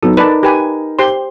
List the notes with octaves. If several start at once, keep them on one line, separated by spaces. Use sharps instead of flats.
F#3 B3 D#4 A4
D#4 A#4 B4 D5 A5
G4 B4 G#5
G4 C5 C6